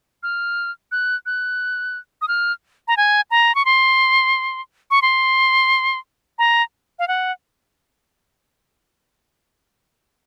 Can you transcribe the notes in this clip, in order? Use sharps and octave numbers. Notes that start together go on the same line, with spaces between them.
F6
F#6
F#6
D#6
F6
A#5
G#5
A#5
C#6
C6
C#6
C6
A#5
F5
F#5